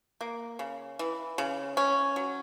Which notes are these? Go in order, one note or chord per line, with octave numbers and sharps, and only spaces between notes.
A#3
C#3
E3
C#3
C#4
F#3